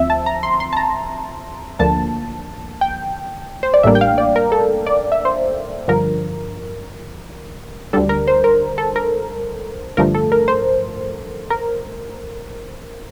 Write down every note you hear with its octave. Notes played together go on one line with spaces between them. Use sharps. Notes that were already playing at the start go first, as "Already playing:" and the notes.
Already playing: D2 F3 C4 E5
A5
A#5
C6
C6
A5
A#5
D2 D3 F3 A#3 A5
G5
C5
D5
A1 A2 G3 A#3 D4 E5
G5
F5
D5
A#4
A4
D5
E5
C5
G2 D3 F3 A#4
D2 D3 G3 D4 A4
A#4
C5
A#4
A4
A#4
A1 G2 D3 F3 A3 A#4
A4
A#4
C5
A#4